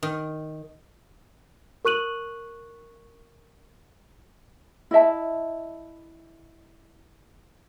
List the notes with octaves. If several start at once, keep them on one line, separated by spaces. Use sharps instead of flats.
D#3
A#4 C#6 F#6 D#7 F#7
E4 D#5 E5 A5